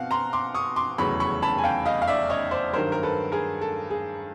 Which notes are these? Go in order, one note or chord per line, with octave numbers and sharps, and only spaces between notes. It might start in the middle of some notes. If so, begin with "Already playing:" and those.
Already playing: B2 C4 F5 F#5
A#5 C6
C6 D6
C#6 D#6
C6 D6
F1 E2 C#3 F#3 B5 C#6
B5 C#6
A5 B5
G#5
F5 G5
D#5 F5
F5
D5 E5
C#5 D#5
C5 D5
G2 D#3 F#3 A#4 C5
A#4
A4 B4
G#4 A#4
A4
G#4